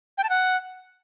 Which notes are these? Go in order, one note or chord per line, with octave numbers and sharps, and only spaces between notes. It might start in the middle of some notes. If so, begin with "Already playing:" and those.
G5
A5
F#5